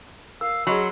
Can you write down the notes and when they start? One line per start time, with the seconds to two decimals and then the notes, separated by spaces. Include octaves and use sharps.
0.41 A#4 F5 E6
0.67 F#3 C#4 F#4 G#4 D#5 B5 C6